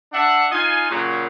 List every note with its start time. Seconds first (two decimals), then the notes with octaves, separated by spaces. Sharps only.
0.13 D4 E5 F#5
0.52 D#4 F4 D#5 F5 G#5
0.90 A#2 C#3 F#3